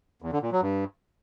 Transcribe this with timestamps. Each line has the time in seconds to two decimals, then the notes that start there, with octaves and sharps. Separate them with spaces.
0.22 E2
0.32 D3
0.42 A#2
0.52 F#3
0.62 G2